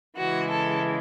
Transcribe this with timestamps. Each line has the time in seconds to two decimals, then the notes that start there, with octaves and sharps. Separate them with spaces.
0.18 C#3 E3 G#3 F#4
0.49 A4